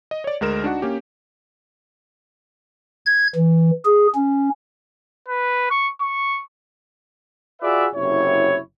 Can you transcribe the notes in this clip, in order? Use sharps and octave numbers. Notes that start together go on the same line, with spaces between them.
D#5
C#5 D5
D2 G#3 A#4 E7
D4 D#4 F#4 F#5
A#3 C#4 G4
G#6
E3
G#4
C#4
B4
C#6
C#6
F4 F#4 G#4 B4 D5 E5
F#1 C3 E4 C#5